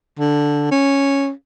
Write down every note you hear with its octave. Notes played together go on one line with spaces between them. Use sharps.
D3
C#4